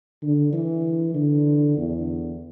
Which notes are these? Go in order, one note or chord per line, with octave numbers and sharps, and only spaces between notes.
D3
E3
D3
E2